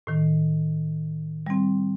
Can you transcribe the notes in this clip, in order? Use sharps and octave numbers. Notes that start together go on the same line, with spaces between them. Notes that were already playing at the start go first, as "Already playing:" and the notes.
A2 D#3
G3 C4